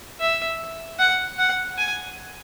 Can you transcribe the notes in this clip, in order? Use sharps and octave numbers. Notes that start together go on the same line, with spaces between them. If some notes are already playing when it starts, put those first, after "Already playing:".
E5
F#5
F#5
G#5